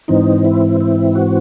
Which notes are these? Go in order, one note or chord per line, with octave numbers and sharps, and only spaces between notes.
G#2 E3 C4 D#4
E4
E4
F#4